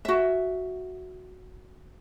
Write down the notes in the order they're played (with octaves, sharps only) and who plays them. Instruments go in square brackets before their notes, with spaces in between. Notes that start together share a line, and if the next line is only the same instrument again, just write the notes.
[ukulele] F#4 E5